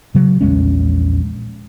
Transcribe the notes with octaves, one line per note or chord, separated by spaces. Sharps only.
C#3 F#3
A#1 E2 G#3 C#4